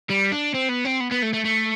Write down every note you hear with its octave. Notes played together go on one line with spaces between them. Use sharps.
G3
D4
C4
B3
C4
B3
B3
A3
A3
A3